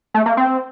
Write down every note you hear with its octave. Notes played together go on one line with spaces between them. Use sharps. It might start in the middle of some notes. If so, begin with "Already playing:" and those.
A3
A#3
C4